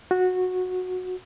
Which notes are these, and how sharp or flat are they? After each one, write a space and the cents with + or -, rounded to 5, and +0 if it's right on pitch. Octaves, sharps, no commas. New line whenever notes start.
F#4 -15